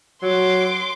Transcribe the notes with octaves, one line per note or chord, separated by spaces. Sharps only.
F#3 C6 D6